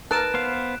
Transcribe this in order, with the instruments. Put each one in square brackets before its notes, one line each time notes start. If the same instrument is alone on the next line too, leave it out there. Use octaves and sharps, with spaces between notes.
[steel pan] A#4 A5 [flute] B4 [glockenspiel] F#6 D7 E7
[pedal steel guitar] B3 C5 F5